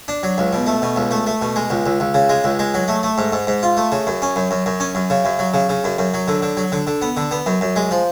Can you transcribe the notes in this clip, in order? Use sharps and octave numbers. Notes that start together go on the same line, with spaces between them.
D4
F#3
C#2
B2
A3
B2
C#2
A3
A3
B2
G#3
C#2
C#2
C#2
C#3
G#3
C#2
G#3
F#3
A3
A3
G#2
G#2
G#2
F4
A3
C#3
F#2
C#4
F#2
F#2
F#2
C#4
F#2
C#3
F#2
F#3
C#3
C#3
F#2
F#2
F#3
D3
D3
F#3
D3
D3
B3
D3
B3
F#2
F#2
G#3
F3